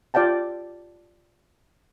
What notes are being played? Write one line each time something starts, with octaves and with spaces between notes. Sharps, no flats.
F4 D5 F5 G5 A5